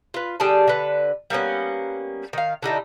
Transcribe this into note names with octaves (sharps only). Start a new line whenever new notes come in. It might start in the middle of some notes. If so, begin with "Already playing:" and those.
F4 B4
D3 G3 G#4 A5
D3 B4
G3 A#3 B3 C#4
D#3 F5
D3 G3 D#4 E4